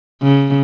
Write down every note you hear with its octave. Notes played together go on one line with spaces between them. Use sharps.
C#3